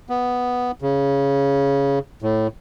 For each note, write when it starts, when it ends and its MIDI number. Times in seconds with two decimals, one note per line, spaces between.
0.09 0.72 59
0.82 1.99 49
2.22 2.47 45